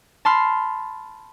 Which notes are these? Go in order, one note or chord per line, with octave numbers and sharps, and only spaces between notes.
A5 B5 C6 F6 C7